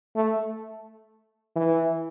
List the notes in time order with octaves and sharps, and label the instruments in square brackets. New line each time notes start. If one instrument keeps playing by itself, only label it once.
[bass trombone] A3
E3